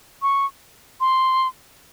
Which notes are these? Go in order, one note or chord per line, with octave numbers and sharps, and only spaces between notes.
C#6
C6